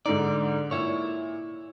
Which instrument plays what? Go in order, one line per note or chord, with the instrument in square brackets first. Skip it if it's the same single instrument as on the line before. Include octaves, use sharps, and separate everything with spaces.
[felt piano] G#2 D3 D#4 [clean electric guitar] D5
[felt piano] A#2 [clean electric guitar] E4 C#5